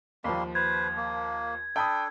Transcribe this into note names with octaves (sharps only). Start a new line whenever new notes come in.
D#2 F3 G3 A#3 C6
B4 C5 G#6
A#3
D4 A4 G5 B5 D#6